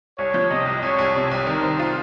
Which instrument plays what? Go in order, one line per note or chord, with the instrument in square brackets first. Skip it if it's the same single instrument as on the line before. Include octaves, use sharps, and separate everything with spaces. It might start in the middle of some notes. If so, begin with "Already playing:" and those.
[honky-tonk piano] C2 [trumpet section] C#5
[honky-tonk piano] F3
[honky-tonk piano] C3 [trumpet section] D#5
[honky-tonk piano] C2
[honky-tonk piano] C2 [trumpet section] C#5
[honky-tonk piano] C2
[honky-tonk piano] C3 [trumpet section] C#5
[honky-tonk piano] C2
[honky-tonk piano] D#3 [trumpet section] A#4
[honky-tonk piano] C5
F4